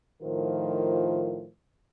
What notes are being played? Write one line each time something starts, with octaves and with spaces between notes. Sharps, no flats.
A2 D#3 F3 F4 A#4 C5